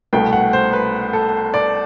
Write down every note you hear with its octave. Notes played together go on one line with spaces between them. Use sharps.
C2 B2 A3 G5
F#5
C5
B4
A4
D5